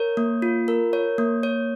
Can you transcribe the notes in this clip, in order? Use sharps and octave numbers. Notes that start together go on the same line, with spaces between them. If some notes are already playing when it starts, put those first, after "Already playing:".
Already playing: A#4 C#5
A#3
F4
A#4
C#5
A#3
C#5